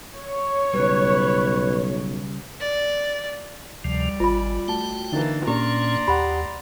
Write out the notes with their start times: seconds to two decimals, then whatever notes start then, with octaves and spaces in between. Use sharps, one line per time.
0.16 C#5
0.73 B1 C#3 G3 B4
2.60 D5
3.84 D2 C3 F3 G3 D5
4.20 G#1 F4 B5
4.68 A3 F#4 G5 A5
5.12 D3 E3 A#3 D4 D#4 A6
5.47 A#2 A#3 C#4 D4 G4 D5 A#5 C6
6.08 D#2 G4 F#5 B5